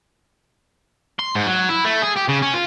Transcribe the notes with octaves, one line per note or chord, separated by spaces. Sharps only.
C6
G#2
F#3
E4
A3
G#4
G4
C#3
C#4
F4